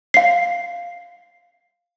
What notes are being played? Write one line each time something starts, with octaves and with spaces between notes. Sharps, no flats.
F5 C7